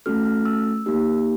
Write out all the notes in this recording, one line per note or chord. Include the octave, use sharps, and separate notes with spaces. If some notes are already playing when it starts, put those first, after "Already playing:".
A3 C#4 F#4 A4 F6
F6
E6
A#3 D#4 G4